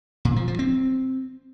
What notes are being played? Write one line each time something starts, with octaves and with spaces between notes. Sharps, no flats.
A#2
F3
F3
C4